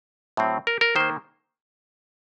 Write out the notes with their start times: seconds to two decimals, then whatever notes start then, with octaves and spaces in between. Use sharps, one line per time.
0.37 A2 F#3 C4
0.67 A#4
0.81 A#4
0.96 D#3 A#3 C5